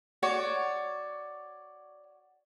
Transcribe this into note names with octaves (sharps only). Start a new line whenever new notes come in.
F#4 C#5 D5